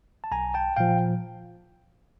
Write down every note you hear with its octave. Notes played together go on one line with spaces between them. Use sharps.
A5
B1 G#5 A#5
G5 A5
A#2 F3 F5 G5